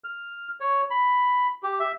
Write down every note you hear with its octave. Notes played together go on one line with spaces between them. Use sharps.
F6
C#5
B5
G4
E5